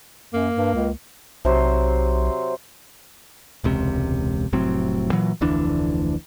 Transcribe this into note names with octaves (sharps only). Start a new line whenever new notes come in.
F#2 A#3
G2
C#2
B1 C3 F#3 C5
E1 C#2 C3
F1 A2 F#3 C4
A#2 E3 F#3
F1 D2 E3 D4